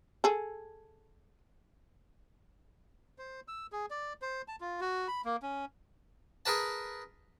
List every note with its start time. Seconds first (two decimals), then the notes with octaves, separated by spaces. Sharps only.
0.24 G#4 A4
3.18 C5
3.48 E6
3.72 G#4
3.90 D5
4.22 C5
4.48 A5
4.60 F4
4.81 F#4
5.08 B5
5.25 A#3
5.42 C#4
6.46 G#4 A#4 B4 A5